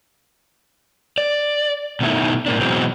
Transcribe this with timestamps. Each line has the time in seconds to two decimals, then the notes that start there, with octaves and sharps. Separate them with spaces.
1.18 D5
2.01 B2 D#3 A3 A#3 D#4 E4
2.46 A2 A#3 D4
2.61 B2 E3 F#3 G#3 C4